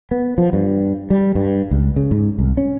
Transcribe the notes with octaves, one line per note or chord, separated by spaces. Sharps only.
B3
F3
G2
G3
G2
C#2
C#3
G#2
C2
C#4